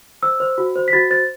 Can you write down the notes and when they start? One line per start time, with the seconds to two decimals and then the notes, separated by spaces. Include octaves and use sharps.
0.23 C5 E6
0.40 C5
0.58 F#4
0.76 C5
0.88 B6
0.93 F#4 A6
1.10 C5 A6